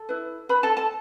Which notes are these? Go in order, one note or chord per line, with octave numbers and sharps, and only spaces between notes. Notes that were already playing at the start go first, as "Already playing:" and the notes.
Already playing: A4
E4 B4
B4 B5
A4 A5
A4 A5